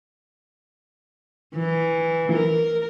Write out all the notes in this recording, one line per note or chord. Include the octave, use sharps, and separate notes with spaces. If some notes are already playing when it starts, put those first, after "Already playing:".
E3
A#4